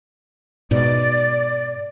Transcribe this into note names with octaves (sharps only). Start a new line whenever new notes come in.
G#2 B2 D5